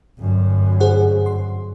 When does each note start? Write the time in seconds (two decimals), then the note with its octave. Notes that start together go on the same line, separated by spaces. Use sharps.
0.19 G1 F#2
0.80 G#4 C5 F#5
1.26 C6